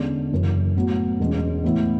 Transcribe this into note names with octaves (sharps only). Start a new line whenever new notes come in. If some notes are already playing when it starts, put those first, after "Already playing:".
Already playing: E2 D3 G#3 C#4
F#1 F#2 E3
A2 F#3 B3 F#4
E1 E2 B2 G#3 C#4
A2 E3 B3 E4